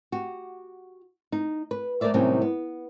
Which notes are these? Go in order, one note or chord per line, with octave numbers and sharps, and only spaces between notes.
F#4 G4
D#4
B4
A3 A#3 A#4 C5 D5 E5
A2 C3 D#3 F#3 G3 C#4
B3